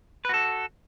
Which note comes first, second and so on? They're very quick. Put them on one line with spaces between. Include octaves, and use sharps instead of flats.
B4 F#4 A4